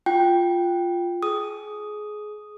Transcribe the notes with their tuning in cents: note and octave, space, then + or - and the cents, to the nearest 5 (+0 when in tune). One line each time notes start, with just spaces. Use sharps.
F4 +0 G5 +0
G#4 +20 D#6 +0